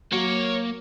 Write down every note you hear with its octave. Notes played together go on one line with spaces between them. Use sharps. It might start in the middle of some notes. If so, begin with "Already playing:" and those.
F#3 A#3 C#5